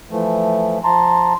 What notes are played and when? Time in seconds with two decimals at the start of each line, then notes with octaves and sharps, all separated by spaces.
0.11 E3 F3 A3
0.84 F3 A5 A#5 C6